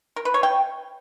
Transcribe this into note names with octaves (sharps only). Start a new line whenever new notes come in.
A#4
B4
C#5
G5